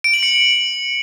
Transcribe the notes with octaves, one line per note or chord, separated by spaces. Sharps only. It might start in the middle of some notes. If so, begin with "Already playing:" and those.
D7
F#7
C#7